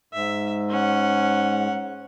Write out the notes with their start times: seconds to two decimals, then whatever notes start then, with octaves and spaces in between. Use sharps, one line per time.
0.13 G#2 E5
0.69 C#4 F#5